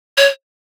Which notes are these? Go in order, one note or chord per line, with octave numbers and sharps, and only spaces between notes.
C#5